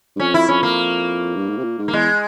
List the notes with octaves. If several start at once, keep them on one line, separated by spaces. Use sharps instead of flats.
G2
F2 C#4
E4
F2 C#4
A#3
G2
G#2
C3
A#2
G#2
A#3
E2 G#3